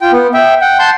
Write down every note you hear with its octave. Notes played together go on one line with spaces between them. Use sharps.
F4 G5
B3
E5 G5
F#5 G5
F#5 A5 C6 G6